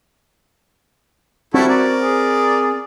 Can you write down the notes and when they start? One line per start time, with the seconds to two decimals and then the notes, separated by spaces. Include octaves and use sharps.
1.54 G3 C4 E4 F#4 A4
1.68 A#4 D5
2.02 G#4